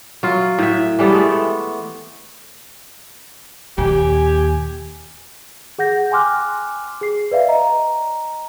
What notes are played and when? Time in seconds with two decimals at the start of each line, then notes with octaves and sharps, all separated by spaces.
0.23 F#3 F4
0.59 A2 E5
0.99 E3 G3 B3 A4
1.10 G#3 A3
3.78 D#2 A#2 G4 G#5
5.79 G#4 F#5 G6 A#6
6.11 G5 G#5 C6 D6 F6 F#6
7.01 G#4 C7
7.31 B4 D5 E5 F5
7.48 D#5 A#5